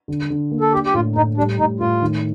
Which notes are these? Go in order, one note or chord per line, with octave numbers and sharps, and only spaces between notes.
D3
D3
A#3
A4
D4 G4
G4
A2 F4
A2 D#4
G3 D4
A2 D#4
A2 F4
D#3